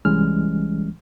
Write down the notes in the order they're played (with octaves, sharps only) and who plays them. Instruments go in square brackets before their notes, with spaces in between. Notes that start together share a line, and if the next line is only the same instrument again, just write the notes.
[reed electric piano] C2 E3 G3 G#3 C#4 F6